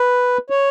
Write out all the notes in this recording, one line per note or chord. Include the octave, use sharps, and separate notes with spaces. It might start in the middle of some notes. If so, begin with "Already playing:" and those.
Already playing: B4
C#5